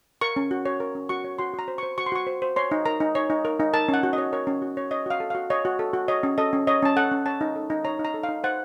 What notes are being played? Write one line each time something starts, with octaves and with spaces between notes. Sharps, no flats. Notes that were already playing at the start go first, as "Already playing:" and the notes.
A#4 C#6
C#4
F#4
C#5
A#4
C#4
F#4 C#6
C#5
F#4 C6
F#4 A#5
C5
C5 C#6
F#4 C#6
C6
F#4 C#6
C5
C5
C#5 C6
D#4
A#4 A#5
D#4
C#5
D#4
A#4
D#4
A#4 A5
C#4
F#5
F#4
D#5
C#5
A#4 C#5
C#4
F#4
C#5
C#5 D#5
F#4 F5
A4
F#4 F5
C#5 D#5
F#4
A4
F#4
C#5 D#5
C#4
A4 D#5
C#4
C#5 D#5
C#4 A5
A4 F#5
C#4
C#5 A5
D#4
A4
D#4
C#5 A#5
D#4
A#5
A4
F5
D#4
C5 F#5